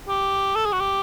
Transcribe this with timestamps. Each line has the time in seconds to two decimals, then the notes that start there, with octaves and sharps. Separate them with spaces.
0.08 G4
0.55 A4
0.65 G#4
0.73 F#4
0.80 G4